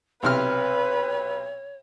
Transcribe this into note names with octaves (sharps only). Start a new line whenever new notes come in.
B1 C3 B4 C#5 F6